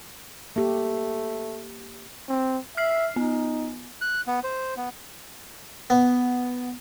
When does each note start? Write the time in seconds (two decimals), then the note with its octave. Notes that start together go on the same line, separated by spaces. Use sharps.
0.56 A3 A#3 G4
2.29 C4
2.77 E5 F6 C7
3.16 B3 D#4
4.01 F#6
4.27 B3
4.44 C5
4.77 B3
5.90 B3